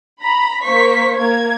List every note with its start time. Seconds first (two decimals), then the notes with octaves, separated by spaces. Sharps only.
0.22 A#5 B5
0.62 A#3 C5 C#6 B6
1.16 A#3 G#6